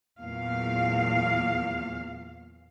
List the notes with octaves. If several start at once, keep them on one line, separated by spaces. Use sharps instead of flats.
E2 A#2 F#3 F5